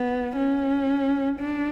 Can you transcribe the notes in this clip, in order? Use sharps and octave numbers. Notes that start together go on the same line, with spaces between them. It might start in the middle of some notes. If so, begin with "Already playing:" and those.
Already playing: B3
C#4
D4